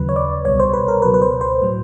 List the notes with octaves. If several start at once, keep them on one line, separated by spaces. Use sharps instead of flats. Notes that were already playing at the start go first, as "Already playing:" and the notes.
Already playing: D#2 C#3 F#3 B4
C#5
D5
C2 B2 G3 C#5
C5
B4
A#4
C#2 B2 F#3 B4
B4
C5
C5
A2 F#3